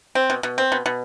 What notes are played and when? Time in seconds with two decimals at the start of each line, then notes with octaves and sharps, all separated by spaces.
0.15 C4
0.30 B2
0.43 B2
0.58 C4
0.72 B2
0.86 B2